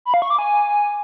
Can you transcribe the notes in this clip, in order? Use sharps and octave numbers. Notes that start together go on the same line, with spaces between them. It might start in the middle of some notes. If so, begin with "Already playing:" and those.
B5
F5
C#6
D6
G#5